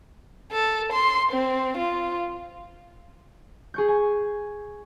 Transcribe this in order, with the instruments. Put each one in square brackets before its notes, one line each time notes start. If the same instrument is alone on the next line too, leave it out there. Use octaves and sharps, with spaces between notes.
[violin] A4
C6
C4
F4
[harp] G#4 C#6 G6
G#5